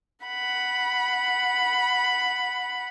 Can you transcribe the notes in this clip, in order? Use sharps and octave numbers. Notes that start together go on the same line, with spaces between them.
F#5 B5